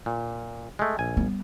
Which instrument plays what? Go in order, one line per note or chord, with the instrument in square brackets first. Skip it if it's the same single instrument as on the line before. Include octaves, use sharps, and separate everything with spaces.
[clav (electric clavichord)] A#2
G#3 A3
A#1 G#5
[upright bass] G3 B3